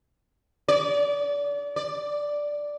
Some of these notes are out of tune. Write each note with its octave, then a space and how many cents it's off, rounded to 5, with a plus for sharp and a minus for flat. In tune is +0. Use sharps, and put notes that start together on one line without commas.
D5 -30
D5 +0